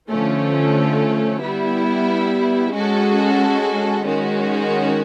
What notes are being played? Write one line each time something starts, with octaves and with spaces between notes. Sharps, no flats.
D3 F3 A3 C#4
G3 B3 E4
G#3 C#4 F#4 A4
D#3 G#3 C#4 F#4